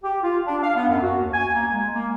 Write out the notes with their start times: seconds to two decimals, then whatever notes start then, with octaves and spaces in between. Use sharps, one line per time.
0.03 G4
0.23 F4
0.46 D4
0.63 F5
0.75 B3
0.89 F#2
1.02 F#4
1.18 D#2
1.33 G#5
1.54 A#3
1.70 G#3
1.95 A#3